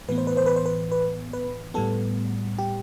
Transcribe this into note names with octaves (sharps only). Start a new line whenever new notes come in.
A2 E3 B3 B4
C5
B4
C5
B4
C5
B4
B4
B4
A2 G3 B3 A4
G4